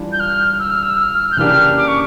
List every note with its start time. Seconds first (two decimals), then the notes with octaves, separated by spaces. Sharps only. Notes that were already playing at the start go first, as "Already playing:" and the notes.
Already playing: E3 G3 D4 F4
0.12 G6
0.19 F6
0.59 E6
0.71 F6
0.82 E6
0.99 F6
1.31 G6
1.37 C#3 E3 A#3 D4 G4 F6
1.77 D6
1.87 C#6